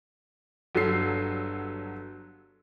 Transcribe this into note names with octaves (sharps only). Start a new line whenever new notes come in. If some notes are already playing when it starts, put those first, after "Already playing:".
G1 F#3 A4 C7